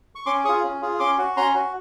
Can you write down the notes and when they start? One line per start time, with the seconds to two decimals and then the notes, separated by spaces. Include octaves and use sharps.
0.15 C#6
0.26 C#4 C6 D6
0.45 G#4 C#6 D#6
0.48 F4
0.63 C#4
0.81 F4 G#4
0.99 C#4 C6 D6
1.18 F#4
1.37 C#4 A#5 C6
1.54 F#4